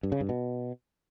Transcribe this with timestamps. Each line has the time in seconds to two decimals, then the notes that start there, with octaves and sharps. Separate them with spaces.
0.03 G2
0.12 C#3
0.20 G2
0.29 B2